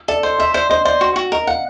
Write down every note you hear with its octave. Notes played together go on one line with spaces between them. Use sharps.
A4 D5
C5 D#5
D#5 E5
C5 D5
C5 D#5
C5 D5
F#4
F#4
A#4 D#5
F5 F#5